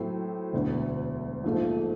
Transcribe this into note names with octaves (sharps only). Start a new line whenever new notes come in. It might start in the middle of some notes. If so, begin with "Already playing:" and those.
Already playing: A2 F#3 A3 C4
E1 D2 D3
A#1 G#2 F3 A3